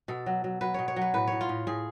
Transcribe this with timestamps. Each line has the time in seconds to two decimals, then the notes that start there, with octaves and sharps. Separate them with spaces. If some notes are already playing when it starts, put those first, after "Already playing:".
0.08 B2 A4
0.26 F#3
0.44 F#3
0.61 F#3 B4
0.74 B2 C#5
0.88 C#5
0.96 F#3
1.02 B4
1.14 A2 B4
1.27 A2 C#5
1.41 F4
1.49 A2
1.67 A2 G#4